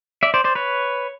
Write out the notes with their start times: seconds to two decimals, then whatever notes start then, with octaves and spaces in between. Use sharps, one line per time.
0.23 D5 E5
0.34 C5 D5
0.44 C5 D5
0.55 B4 C#5